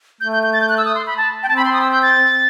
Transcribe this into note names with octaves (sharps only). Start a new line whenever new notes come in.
A3 G6
G6
G6
A6
G6
F#6
E6
D#6
C6
B5
A5
G5
C4 A5
B5
C6
D#6
E6
G6
A6